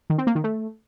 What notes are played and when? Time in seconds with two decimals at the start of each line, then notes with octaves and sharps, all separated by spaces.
0.10 D#3
0.18 C4
0.27 A#3
0.35 D#3
0.44 A3